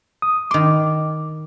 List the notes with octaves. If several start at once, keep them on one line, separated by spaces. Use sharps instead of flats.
D#6
D#3 C6 D6